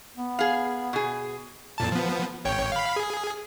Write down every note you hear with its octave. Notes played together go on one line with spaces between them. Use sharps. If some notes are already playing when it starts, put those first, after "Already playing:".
B3
G#4 F5
B2 G#4
F2 A#2 A5
F3 B3
G#1 C#5 G5
F5 B5
G#4